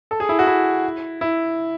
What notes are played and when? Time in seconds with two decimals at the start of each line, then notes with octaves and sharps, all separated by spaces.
0.11 A4
0.20 G#4
0.29 E4
0.39 F#4
0.47 E4
1.21 E4